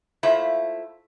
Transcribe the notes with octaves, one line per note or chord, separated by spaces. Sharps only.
A3 A#3 E4 F4 C5